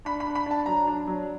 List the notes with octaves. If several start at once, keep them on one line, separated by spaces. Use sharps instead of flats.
D4 B5
B5
D4
B5
D4 A5
F#3 A#5
D4
F#3